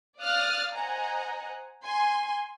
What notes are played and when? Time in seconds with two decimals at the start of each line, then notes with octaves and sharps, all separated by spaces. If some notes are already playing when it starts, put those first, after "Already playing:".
0.19 D5 F5 D#6 F6 F#6 A6
0.75 C5 D#5 F#5 G#5 A#5
1.85 G#5 C6